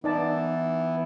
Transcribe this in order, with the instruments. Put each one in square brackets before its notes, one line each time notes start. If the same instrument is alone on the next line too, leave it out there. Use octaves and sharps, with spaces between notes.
[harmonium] E3 B3 E4 [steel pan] D#4 D5 A5